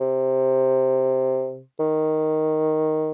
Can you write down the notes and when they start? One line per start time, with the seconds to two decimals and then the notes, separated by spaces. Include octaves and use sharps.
0.01 C3
1.80 D#3